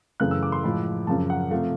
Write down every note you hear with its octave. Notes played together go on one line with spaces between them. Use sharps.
F#2 C#3 E3 A3 F#6
E6
D6
C6
A2 F3 G#3 B5
F#2 C#3 F3 A5
F#5
C3 F3 A3 F5